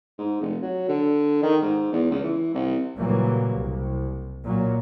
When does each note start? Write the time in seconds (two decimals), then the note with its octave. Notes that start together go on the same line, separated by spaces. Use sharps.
0.19 G#2
0.41 F1
0.62 F#3
0.89 D3
1.43 D#3
1.62 G#2
1.93 E2
2.11 C#2
2.24 E3
2.55 C2
2.96 A#2 C#3 E3 F#3 G3 A#3
3.54 C2
4.43 A#2 F#3